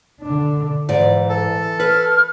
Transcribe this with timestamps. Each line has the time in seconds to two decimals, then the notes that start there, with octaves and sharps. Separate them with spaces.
0.21 D3 D4
0.89 G#2 E3 D5
1.30 A4
1.80 B4 F6